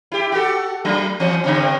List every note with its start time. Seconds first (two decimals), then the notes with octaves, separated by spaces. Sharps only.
0.12 E4 G4
0.32 F#4 G4 A4
0.85 F#3 A3 D4
1.20 E3 C4
1.44 G2 C#3 C4